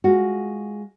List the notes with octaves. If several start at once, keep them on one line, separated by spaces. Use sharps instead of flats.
G#3 F4 F#4